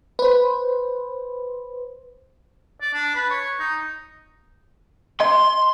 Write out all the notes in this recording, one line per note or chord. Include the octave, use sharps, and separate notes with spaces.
B4 C5
D5
D4
B4
C#5
D#4
D#5 C6